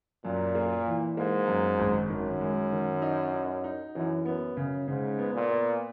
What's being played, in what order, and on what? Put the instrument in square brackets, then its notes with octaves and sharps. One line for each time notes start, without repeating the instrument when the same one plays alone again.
[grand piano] F#2 [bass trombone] A#2
[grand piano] A#3
E3
[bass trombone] G#2 [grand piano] A#3
[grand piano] F#2
G#1
[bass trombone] F#2 [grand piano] D#3
[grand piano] G#3
D#3
D#4
D#4
D#4
[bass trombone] F#2 [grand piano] E3
[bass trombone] F#2 [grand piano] B3
[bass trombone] F#2 [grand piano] C#3
[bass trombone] G#2 [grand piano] C#3
[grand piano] B3
[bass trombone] A#2
[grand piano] B3